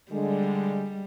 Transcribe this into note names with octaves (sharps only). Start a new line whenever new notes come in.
D3 G3 G#3